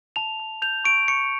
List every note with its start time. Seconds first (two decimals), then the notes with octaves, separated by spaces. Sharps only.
0.16 A5 F7
0.40 A5
0.62 G6 F7
0.84 C#6 D7
1.08 C#6 C#7